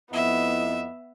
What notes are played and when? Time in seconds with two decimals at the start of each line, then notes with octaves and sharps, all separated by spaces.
0.12 F2 B3 E4 D#5 E5